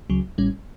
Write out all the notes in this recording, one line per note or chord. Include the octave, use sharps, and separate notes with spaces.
C#2 C#3 F#3
A1 A2 G3 C#4